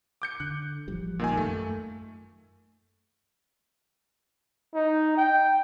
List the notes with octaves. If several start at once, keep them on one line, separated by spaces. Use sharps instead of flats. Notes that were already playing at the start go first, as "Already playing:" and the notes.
D6 G6 C#7
D3 F#6
A1 F3 G3
A#2 D#3 G#5
F#2 A3
D#4
G5